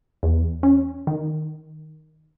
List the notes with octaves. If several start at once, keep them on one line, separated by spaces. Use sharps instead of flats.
E2
C#4
D#3